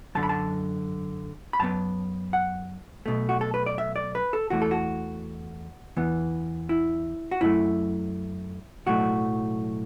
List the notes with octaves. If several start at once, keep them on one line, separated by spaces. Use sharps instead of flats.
F#2 D3 F#3 A5
B5
A5
B5
F#2 F#3 B3 A5
F#5
B1 B2 A3
F#4
A4
B4
D5
E5
D5
B4
A4
E2 E3 A3 F#4
A4
F#4
E2 E3 B3
E4
F#4
F#2 F#3 A3 E4
B1 A2 F#3 A3 F#4